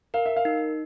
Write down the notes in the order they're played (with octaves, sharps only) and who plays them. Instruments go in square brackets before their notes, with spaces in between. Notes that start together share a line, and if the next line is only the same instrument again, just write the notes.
[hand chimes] A#4 [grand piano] F5
[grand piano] E5
F5
[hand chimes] D#4